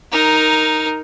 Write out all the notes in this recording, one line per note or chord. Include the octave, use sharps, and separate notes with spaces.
D#4 A#4